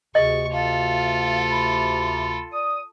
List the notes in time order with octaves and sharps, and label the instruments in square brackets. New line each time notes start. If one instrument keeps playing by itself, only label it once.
[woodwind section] D2 C3 [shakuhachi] G#4 [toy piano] D#5 [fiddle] C#6
[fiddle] F4 A4 [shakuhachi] F5
[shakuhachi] B5
[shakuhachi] D5 [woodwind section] D#6